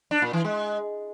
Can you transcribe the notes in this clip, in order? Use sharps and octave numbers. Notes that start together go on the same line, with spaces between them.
D4
A#2
E3
G#3